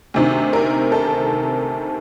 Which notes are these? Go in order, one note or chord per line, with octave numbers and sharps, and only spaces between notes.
D2 C3 D#3
A#4
A4